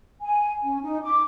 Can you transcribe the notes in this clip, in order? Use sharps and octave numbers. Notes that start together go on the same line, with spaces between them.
G#5
C#4
D#4
D6